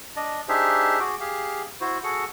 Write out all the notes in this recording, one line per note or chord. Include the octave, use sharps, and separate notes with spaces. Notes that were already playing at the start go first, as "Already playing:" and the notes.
D4 D5 D#5
D4 D#4 G4 G#4 C5 E5
F#4 G#4 D6
G4 G#4 F5
E4 F#4 C5
F#4 G#4 A4 F#5